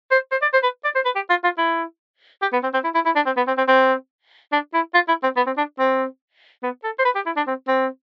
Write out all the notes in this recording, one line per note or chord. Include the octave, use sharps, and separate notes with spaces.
C5
C5
D5
C5
B4
D5
C5
B4
G4
F4
F4
E4
G4
B3
C4
C4
E4
E4
E4
D4
C4
B3
C4
C4
C4
D4
E4
F4
E4
C4
B3
C4
D4
C4
B3
A4
C5
B4
G4
E4
D4
C4
C4